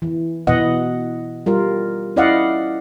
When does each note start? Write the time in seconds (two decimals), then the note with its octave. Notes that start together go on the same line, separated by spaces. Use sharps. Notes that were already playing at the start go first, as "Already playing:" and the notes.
0.02 E3
0.47 B2 E3 B3 D#5 F#5
1.46 G3 F4 A#4
2.16 C#4 E4 D5 D#5 F5 F#5